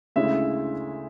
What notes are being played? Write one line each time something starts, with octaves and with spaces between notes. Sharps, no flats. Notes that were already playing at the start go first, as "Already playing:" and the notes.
D2 C#3 G#3 C#4 E4 E5